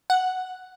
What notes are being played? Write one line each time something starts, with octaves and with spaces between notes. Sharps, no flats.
F#5